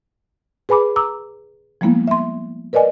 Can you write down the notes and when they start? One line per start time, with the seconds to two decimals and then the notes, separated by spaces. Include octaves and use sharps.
0.69 G#4 B4 G#5 B5 D6
0.96 A#5 D6 E6
1.81 F3 G3 G#3 A#3 B3 E4
2.08 E5 C6
2.73 A#4 B4 D5 D#5 G#5